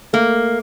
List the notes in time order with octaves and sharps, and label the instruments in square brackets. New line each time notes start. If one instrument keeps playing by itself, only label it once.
[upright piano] A3 [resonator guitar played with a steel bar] A#3